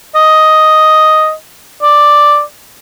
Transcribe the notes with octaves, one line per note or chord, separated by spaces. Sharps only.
D#5
D5